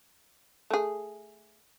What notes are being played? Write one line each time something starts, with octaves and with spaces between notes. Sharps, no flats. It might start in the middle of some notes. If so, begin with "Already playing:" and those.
A3 G#4